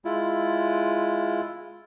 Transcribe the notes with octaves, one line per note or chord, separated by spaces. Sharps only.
G#3 E4 F4